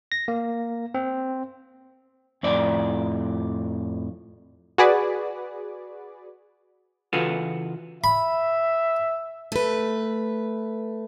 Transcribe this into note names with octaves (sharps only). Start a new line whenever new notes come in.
A#6
A#3
C4
F2 A2 D5
F#4 G#4 B4 D5
C#3 E3 F4 F#4 A4 B4
E5 B5
A3 B4